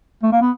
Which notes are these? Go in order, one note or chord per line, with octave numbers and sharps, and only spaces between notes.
A3
A#3
B3